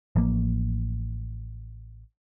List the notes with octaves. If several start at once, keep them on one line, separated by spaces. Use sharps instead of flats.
A1 F3 A#3